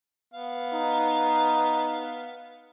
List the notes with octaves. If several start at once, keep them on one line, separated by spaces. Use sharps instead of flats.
B3 F5
D#4